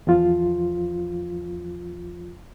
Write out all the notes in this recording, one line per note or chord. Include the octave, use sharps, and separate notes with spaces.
E2 F3 F4